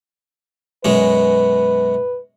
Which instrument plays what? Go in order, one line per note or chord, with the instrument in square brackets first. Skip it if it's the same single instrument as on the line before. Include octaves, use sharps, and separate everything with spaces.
[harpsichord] F#2 B2 G#3 [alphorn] B4